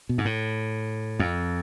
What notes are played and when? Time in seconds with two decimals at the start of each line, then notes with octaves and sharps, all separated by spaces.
0.09 B2
0.18 G#2
0.25 A2
1.19 F2